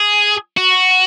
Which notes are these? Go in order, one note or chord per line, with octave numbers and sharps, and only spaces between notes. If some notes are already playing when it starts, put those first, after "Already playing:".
Already playing: G#4
F#4